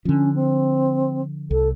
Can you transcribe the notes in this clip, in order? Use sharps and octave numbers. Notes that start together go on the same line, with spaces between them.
D3 F3 C#4
C4
C2 A4